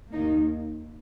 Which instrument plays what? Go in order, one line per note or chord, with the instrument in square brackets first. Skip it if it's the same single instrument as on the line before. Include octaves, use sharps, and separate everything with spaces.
[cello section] D#2 D#3 A#3 D#4